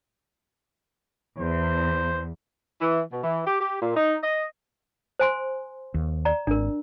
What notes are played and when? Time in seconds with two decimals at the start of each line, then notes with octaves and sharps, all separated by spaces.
1.39 E2 C5
2.81 E3
3.11 B2
3.24 E3
3.47 G4
3.61 G4
3.81 A#2
3.96 D#4
4.23 D#5
5.20 C5 G#5 C6
5.94 D#2
6.25 D5 A#5
6.47 G#1 D4 A#4